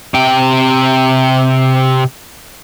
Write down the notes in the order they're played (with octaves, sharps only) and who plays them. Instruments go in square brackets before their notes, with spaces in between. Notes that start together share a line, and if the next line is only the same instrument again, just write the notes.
[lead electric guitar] C3 G5